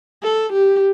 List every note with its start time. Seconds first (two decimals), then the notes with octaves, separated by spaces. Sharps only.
0.23 A4
0.53 G4